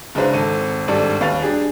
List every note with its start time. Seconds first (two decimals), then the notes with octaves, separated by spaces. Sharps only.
0.15 F#1 G#3 D4 B4 C5 F5
0.33 G#1 C4 A4 D#7
0.88 G#1 G2 G3 A4 D5
1.21 D#2 B4 F5 A6 F7
1.42 G3 D4 G4 G#4